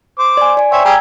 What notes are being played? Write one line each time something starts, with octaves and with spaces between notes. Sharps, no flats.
C5 D6
D5 G#5
D5 G#5
C5 C#5 E5 G5
G3 G4 G#4 A#5 E6 G#6